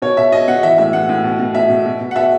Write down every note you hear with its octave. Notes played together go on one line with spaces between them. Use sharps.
B2 C#5
B2 E5
B2 D#5
B2 F#5
E3 E5
A2 E5
A2 F#5
A2
B2
B2
B2 E5
B2
B2
B2
F#5
B2 E5